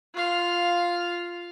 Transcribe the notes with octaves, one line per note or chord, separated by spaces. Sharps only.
F4 F5